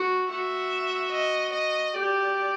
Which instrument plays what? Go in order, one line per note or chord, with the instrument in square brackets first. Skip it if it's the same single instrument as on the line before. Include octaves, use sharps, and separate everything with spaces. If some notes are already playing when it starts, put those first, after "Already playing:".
Already playing: [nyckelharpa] F#4
[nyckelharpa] F#4 [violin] E5
[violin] D#5
D#5
[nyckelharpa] G4 [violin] D5